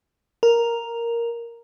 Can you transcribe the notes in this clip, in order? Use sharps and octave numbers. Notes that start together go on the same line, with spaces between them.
A#4